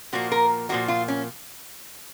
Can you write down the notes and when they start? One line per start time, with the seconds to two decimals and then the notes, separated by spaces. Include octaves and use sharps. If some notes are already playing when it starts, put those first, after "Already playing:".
0.13 A#2 F3 A#3 F#4
0.32 A#4
0.69 A#2 F3 A#3 F#4
0.88 F4
1.08 C#4